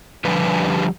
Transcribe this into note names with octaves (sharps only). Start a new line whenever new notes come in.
D3 F3 G3 G4 B4